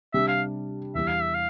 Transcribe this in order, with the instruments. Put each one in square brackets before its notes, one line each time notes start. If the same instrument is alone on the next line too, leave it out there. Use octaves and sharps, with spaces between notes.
[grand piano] C3 G3 D4 [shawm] E5
[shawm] F5
[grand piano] E2 E3 G3 [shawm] E5
[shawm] F5
E5
F5